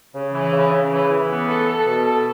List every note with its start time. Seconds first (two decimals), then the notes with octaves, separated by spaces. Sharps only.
0.14 C#3
0.33 E3
0.52 C#3
0.71 C#3
0.90 E3
1.10 E3
1.29 B3
1.48 A4
1.68 A4
1.87 B2
2.05 A4